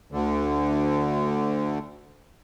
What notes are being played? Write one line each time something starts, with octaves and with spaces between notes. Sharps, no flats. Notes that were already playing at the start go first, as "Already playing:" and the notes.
D2 D3